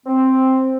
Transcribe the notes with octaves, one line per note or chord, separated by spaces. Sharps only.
C4